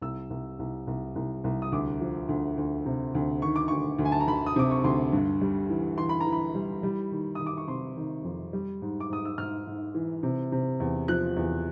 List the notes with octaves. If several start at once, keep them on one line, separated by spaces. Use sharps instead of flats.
C2 E6
C2
C2
C2
C2
C2
D#6
D2 D6
F3
D2
D2
C3
D2
D#3 C#6
D6
D2 C#6
D2
G#5
A5
A#5
D2 B5
D#6
C3 D6
C#6
D2 C6
G2
G3
E3
E3 C6
B5
A#5
E3
B5
G3
G3
D#3
D#3 D#6
D6
C#6
C3 C6
D#3
F2
G3
G#2
D6
G#2 D#6
E6
G#2 F6
G#2
E3
C3
C3
E2
F3 F#6
E2